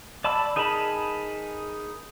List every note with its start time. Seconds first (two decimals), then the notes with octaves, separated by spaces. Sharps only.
0.24 D5 A5 B5 E6
0.56 D#4 G#4 A#4 A5 B5